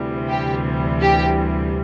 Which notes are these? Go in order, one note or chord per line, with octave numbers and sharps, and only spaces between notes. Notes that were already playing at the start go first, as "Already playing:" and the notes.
Already playing: D2 C3 E3 G3
G4
G4